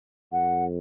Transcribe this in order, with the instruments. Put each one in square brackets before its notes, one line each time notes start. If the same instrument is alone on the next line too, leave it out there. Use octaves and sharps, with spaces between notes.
[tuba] F2 [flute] F#5